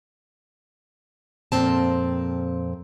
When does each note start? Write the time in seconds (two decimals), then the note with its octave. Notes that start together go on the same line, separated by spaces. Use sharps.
1.52 F2 A#2 C4 A5